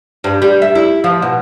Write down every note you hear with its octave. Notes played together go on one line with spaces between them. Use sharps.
G2
G3
E5
E4
F3
B2